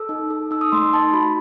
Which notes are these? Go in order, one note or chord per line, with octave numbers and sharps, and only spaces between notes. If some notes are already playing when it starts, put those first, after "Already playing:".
Already playing: A4 E6
D#4
A4
D#4 E6
D#6
A3 C6
C6
D#4 A5
F#4 B5